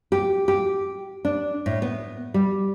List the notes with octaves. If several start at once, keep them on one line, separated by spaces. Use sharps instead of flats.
G4
G4
D4
A2
B3
G3